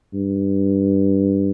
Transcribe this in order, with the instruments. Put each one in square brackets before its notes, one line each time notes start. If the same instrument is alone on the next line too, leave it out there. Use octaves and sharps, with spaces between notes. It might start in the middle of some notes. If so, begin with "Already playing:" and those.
[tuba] G2